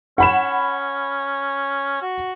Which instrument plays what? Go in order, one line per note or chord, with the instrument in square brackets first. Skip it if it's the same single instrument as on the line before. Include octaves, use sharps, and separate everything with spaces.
[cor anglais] C#4 [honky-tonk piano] F#5 B5 E7
[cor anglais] F#4